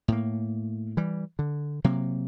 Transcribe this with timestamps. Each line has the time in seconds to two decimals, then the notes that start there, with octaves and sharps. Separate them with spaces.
0.08 A2 A#3
0.97 E3 G3
1.39 D3
1.84 C3 F#3 A#3